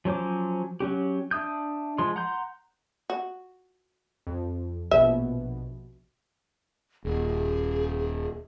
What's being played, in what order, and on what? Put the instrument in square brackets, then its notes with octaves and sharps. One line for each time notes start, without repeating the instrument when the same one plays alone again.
[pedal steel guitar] F3 F#3 C#4 C5 D6
F#3 C#4 G4
D4 E5 D#6 G6
F3 G#3 C6
F#5 A#5 C6 G6
[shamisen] F#4
[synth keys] F2
[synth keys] A#1 B2 [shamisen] E5
[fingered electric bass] D#1 [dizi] G#4